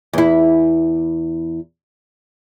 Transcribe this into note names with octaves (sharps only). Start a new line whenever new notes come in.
E2 E4